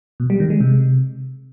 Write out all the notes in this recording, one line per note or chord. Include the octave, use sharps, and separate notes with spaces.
B2
G3
D#3
G#3
C3